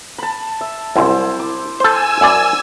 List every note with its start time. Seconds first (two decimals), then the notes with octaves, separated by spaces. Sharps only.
0.18 A5 B5
0.61 E5
0.96 C2 F#2 E4 C5
1.39 D6
1.80 A4 C5 G#5 E6
2.21 F#2 D5